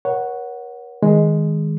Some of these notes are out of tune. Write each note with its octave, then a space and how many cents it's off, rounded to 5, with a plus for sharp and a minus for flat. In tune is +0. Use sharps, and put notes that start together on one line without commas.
A#4 +40 C#5 +0 F#5 +0
D#3 +25 G#3 +0